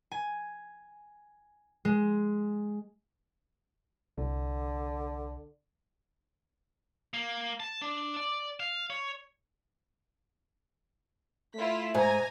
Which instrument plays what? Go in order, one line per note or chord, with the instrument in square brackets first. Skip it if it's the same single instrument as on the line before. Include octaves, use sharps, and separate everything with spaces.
[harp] G#5
G#3
[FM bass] C2 [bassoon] D3
[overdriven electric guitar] A#3
A5
D4
D5
F5
C#5
[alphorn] A3 [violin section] E4 F4 B6
[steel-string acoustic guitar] G#2 [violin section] G#5 A#5 A#6